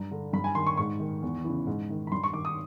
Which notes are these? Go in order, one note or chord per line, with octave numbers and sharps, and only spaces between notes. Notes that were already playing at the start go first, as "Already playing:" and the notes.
Already playing: G2 A#5
D3
G2 B5
G#5
D#3 C6
C#6
G#2 C#6
D#3
E2
C#3 E3
G#2
D#3
B5
G2 C6
C#6
D#3 D6
D#6